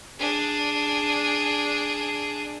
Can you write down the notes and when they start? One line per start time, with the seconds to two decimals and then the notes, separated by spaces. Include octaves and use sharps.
0.19 D4 G#4